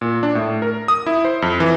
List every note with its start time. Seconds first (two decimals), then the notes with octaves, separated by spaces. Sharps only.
0.01 A#2
0.23 D4
0.35 A2
0.62 A#4
0.88 D#6
1.06 E4
1.25 C5
1.42 F2
1.60 E3